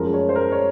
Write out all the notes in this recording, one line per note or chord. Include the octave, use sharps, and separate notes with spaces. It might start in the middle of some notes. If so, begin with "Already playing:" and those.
Already playing: F#2 F3 G#3 A#4
C#5
C5
A#4
C#5